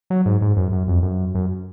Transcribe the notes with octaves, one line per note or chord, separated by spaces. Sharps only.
F#3
G#2
G#2
F#2
F#2
F2
F#2
F#2